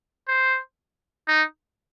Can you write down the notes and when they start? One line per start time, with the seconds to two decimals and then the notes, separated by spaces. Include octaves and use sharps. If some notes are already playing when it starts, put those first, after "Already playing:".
0.28 C5
1.28 D#4